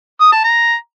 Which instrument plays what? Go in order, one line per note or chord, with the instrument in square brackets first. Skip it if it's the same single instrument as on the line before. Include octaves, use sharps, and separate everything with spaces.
[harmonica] D#6
A5
A#5